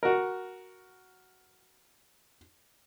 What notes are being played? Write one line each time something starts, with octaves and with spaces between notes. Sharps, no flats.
F#4 A#4